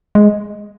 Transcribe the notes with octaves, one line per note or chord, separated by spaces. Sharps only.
G#3